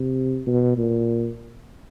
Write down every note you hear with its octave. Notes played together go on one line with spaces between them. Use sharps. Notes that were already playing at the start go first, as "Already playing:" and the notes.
Already playing: C3
B2
A#2